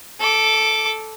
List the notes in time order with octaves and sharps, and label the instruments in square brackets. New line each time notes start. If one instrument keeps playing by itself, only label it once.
[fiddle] A4 D6